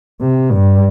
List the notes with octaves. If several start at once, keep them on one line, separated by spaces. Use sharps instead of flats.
C3
G2